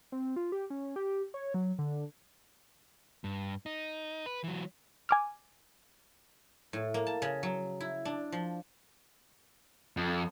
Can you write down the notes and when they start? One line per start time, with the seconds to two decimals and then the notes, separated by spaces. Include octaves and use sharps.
0.12 C4
0.36 F4
0.52 G4
0.70 C#4
0.96 G4
1.34 C#5
1.54 F#3
1.79 D3
3.24 G2
3.66 D#4
4.26 B4
4.44 E3 F#3
5.09 G#5 D6 F6
6.73 A2
6.94 A#3
7.07 A5
7.22 C#3
7.43 F#3
7.80 E4
8.05 D4
8.32 F3
9.97 F2